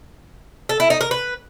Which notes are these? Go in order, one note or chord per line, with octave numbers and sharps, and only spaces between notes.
A4
E4
D#4
A#4
B4